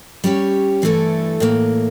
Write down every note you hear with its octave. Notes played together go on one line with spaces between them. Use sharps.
G3 C#4 G4 C#5
G2 E3 A3 E4 A4
A2 E3 A#3